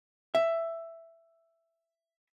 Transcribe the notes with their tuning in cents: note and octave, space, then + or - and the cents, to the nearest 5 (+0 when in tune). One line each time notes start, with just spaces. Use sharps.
E5 +10